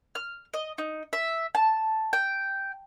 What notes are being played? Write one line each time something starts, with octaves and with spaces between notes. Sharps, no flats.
F6
D#5
D#4
E5
A5
G5